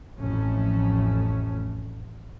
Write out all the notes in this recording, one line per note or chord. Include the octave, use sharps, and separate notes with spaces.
A1 F2 A3 C#4